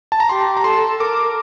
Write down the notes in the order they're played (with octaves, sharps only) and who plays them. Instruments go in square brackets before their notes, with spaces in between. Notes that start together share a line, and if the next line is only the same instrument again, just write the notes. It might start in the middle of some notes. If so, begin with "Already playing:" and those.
[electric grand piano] A5
A#5
[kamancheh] G4 [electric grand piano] C6
[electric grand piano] A#5
[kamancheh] A4 [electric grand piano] C6
[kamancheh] A#4 [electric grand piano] D6